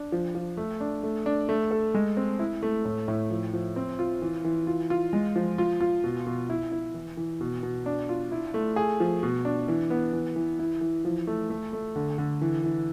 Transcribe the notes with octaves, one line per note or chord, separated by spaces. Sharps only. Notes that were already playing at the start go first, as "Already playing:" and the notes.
Already playing: D4
F3
F3
A3
D4
A3
D4
A3
A4
G#3
C4
E4
A3
A2
A2
F3
F3
C4
F4
E3
E3
F4
F4
G#3
F3
F4
F4
B2
B2
E4
E4
E3
E3
B2
B2
D4
F4
E4
A3
G#4
F3
B2
D4
E3
B3
E3
E3
E4
E3
F3
A3
A3
A3
D3
D3
E3
E3